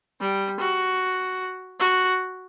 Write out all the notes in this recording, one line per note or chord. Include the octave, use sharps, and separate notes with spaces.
G3
F#4
F#4